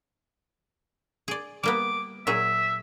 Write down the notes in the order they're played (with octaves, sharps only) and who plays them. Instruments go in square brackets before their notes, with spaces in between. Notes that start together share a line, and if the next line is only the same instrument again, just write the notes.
[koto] G#4 D5
[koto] G3 A#3 B3 [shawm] D6
[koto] A#2 F#3 G#4 [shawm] E5